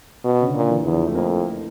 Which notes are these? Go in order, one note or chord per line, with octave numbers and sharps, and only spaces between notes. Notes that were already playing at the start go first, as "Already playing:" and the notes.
B2
C#3
D3
A#2
E3
E2 E3
F3
A3
F2 A#3